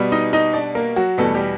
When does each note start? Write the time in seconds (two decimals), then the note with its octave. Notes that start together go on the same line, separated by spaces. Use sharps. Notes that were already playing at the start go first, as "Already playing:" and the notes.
Already playing: B2 G3 B3
0.12 D#4 D#5
0.33 D#4 D#5
0.54 D4 D5
0.75 A#3 A#4
0.96 F#3 F#4
1.18 E2 B2 G3 A3 B3 A4
1.35 G3 G4